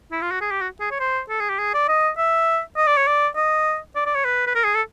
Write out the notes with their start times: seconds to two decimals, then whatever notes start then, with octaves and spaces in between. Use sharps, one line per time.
0.12 E4
0.21 F4
0.32 F#4
0.41 G#4
0.51 G4
0.61 F#4
0.80 G#4
0.91 C#5
1.00 C5
1.29 A4
1.40 G#4
1.49 G4
1.59 G#4
1.74 D5
1.88 D#5
2.18 E5
2.77 D#5
2.87 D5
2.97 C#5
3.07 D5
3.36 D#5
3.96 D5
4.06 D5
4.15 C#5
4.25 B4
4.47 B4
4.55 A#4
4.64 G#4
4.75 A4